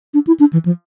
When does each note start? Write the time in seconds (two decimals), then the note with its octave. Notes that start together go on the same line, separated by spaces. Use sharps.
0.14 D4
0.27 E4
0.40 D4
0.53 E3
0.65 F3